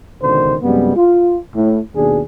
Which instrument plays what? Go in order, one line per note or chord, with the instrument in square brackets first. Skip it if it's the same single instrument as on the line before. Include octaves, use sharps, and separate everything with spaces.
[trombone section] C#2 B2 D3 D#3 C5
F#2 C3 G3 G#3 B3
F4
A2
D#2 B2 D4 G#4